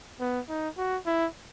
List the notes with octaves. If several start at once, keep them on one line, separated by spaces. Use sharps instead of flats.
B3
D#4
F#4
E4